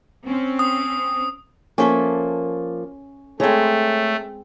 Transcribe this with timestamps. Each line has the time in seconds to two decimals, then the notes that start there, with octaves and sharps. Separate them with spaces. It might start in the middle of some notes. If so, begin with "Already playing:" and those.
0.25 C4 C#4
0.59 D#6
1.78 F3 A#3 C#4 A4 E5
3.40 G#3 A3 C4 C#5 A#5